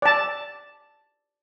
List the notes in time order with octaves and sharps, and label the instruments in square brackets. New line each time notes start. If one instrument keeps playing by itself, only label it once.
[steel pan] D5 A5